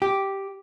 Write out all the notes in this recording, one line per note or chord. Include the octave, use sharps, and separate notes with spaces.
G4